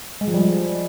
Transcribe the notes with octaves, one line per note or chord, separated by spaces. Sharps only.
G#3
F3
G3
G#3